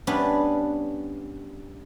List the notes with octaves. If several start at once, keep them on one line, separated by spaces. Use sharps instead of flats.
G3 B3 C#4 D4 B4